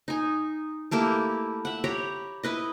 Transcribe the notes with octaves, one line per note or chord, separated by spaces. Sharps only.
D#4 G#5
A3 A#3 E4 G4
E5 F#5
G4 C#5 A#5 B5
E4 B4 D#5